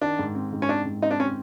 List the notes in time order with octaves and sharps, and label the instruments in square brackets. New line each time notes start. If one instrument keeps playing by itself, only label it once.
[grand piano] D#3 [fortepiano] D4
[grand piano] G#2
C4
G#2
[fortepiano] C#4
[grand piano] C4 [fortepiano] D4
[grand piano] G#2
[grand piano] C4 [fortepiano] D#4
[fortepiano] D4
[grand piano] C4 [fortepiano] C#4